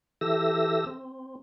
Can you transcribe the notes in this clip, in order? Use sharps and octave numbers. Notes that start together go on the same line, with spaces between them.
E3 G4 A4 E5 E6 A#6
C4